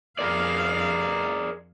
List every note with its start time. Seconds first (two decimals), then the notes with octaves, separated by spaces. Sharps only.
0.19 F2 G#4 A#4 D5 F5